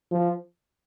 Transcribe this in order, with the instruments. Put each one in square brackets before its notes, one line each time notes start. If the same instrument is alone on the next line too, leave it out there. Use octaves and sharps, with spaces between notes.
[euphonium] F3